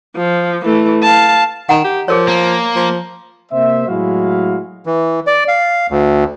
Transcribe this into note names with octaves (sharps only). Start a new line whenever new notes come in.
F3
E3 A3
F5 A5
D#3 F#5 A#5
G4
F3 G#4 A#4 C#5
A#3
F3
C3 A#3 C5 E5
A2 F#3 G#3 E4 F#4 F5
E3
D5
F5
D2